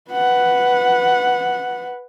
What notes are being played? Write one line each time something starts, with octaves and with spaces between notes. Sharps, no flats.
B4 F#5